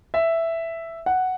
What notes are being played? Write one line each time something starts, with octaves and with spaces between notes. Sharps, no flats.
E5
F#5